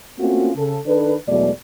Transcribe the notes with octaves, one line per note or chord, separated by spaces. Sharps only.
A3 A#3 C4 C#4 F4 F#4
C#3 A4
D#3 D4 A4 B4
E2 B2 F#3 G#3 A3 D5